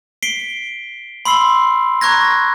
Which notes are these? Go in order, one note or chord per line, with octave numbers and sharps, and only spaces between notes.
B6 C7 D7 G7
B5 C6 E6 C7
A#5 C#6 F#6 G#6 A#6